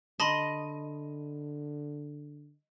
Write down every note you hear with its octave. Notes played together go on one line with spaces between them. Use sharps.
D3 D#5 A5 B5 C6